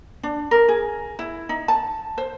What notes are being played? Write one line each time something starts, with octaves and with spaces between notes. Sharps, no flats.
D4
A#4
G#4
E4
D#4
A5
C5